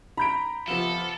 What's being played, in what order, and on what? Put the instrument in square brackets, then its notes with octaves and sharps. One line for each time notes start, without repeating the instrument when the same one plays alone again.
[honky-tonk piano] A#5 G6 B6 [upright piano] B5 D7
[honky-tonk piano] C3 B3 F4 [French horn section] F3 [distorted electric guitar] A4